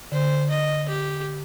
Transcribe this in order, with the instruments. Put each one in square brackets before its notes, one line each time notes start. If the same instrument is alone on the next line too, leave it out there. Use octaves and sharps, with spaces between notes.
[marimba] D3 [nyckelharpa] C5
[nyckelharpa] D#5
G4